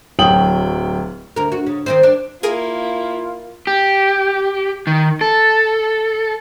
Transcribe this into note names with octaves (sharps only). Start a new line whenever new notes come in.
D1 F#3 G5 D#6 F#7
D2 A#4
F#4
C#3
D#3 C4 C5
D4
A#3 E4 F4 G#4 A#4 G#5
G4
D#3
A4